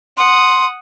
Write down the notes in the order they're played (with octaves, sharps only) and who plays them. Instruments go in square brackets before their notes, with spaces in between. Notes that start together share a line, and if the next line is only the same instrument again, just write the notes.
[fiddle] F#5 D#6 [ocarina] C6